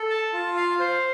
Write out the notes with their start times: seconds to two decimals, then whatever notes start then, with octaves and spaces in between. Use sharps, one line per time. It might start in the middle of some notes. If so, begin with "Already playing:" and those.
Already playing: A4
0.10 A5
0.33 F4
0.56 F5
0.80 C5